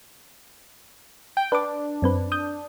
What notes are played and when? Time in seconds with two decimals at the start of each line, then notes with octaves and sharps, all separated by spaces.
1.37 G5
1.52 D4 B4 D6
2.02 F#2 C4 B4
2.32 D#6 G6